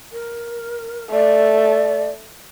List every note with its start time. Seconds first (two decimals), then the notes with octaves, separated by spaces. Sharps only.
0.12 A#4
1.11 A3 D5